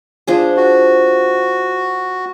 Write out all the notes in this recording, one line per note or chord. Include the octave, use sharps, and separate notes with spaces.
F3 D4 G#4
F#4